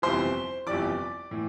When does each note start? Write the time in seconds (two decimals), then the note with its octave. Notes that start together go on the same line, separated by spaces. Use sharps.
0.02 G1 F2 C3 E3 C5 C6
0.66 G1 F2 C3 E3 D5 D6
1.31 A2 E3